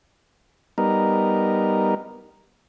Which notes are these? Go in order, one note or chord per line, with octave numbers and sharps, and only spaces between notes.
G3 B3 D#4 A#4